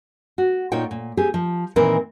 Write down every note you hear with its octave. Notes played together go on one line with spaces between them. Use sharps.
F#4
A#2 D#4 F4 C#5 G5
A#2
C4 G4 G#4
F3
A#2 D#3 E3 C4 A#4 B4